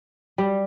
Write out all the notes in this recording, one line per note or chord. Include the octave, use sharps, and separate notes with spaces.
G3